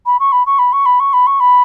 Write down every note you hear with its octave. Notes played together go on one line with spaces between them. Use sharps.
B5
C#6
B5
C#6
B5
C#6
B5
C#6
B5
C#6
B5